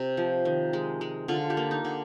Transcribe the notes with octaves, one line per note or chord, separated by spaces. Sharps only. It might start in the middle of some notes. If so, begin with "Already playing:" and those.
Already playing: C3
F3
D#3
G#3
G#3
D3 F4
G4
A#3
D#4
D3